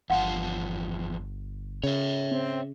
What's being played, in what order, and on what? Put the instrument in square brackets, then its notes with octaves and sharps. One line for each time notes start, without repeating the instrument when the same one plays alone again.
[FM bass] G1 [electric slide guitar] E2 F3 A5 [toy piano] F5 F#5 C6
[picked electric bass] C#3 [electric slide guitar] C#5 E5
[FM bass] C4